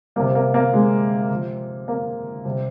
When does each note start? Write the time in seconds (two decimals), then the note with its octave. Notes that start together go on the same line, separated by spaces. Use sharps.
0.16 G3 A#3
0.20 C3
0.35 A#3
0.54 A#3
0.73 G#3
1.30 C3 F3
1.88 A#3
2.45 C3 G3